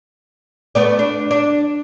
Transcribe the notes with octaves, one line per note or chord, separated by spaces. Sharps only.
A3 B3 D5
D4
D4